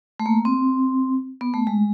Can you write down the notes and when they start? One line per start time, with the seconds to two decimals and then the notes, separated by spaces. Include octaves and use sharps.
0.20 A3
0.26 A#3
0.45 C4
1.41 B3
1.54 A3
1.67 G#3